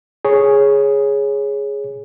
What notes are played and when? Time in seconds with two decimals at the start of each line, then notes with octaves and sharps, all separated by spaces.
0.25 G#4 C#5